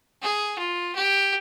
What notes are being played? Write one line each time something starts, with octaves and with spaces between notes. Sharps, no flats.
G#4
F4
G4